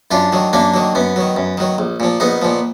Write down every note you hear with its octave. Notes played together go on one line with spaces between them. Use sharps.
F#2 D4 F4
D#3 F#3
F#2 A#3 D4
D#3 F#3
F#2 B3
D#3 F#3
F#2
D#3 F#3
A#1
A#2 F3
A#1 B3 D#4
A#2 F3